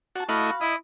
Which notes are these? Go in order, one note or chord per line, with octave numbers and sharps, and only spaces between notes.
F#4 D5 A5
A3 E4 F#4 D#5 F5 B5
E4 D#5